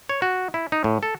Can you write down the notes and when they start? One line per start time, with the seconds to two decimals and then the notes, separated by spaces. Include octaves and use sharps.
0.09 C#5
0.22 F#4
0.54 E4
0.72 D#4
0.84 A2
1.03 A4